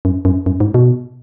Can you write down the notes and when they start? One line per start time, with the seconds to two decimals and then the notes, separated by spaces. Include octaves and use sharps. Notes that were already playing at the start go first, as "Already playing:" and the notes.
0.05 F#2
0.25 F#2
0.46 F#2
0.60 G#2
0.74 B2